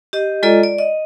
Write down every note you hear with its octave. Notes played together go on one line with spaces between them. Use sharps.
G4 D#5
G#3 F4 A4 D5 D#5 A#5
D5
D#5